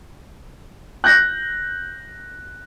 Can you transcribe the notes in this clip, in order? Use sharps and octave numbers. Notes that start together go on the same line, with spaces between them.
F#6 G6 A#6